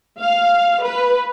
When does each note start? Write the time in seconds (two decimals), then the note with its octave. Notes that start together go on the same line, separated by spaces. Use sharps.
0.21 F5
0.83 B4